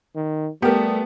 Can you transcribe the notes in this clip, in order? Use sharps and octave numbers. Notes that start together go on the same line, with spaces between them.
D#3
G3 A3 B3 G4 A#4